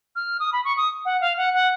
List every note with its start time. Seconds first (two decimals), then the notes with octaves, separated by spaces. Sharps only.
0.16 F6
0.40 D#6
0.53 B5
0.65 C#6
0.77 D#6
1.05 F#5
1.21 F5
1.37 F#5
1.54 F#5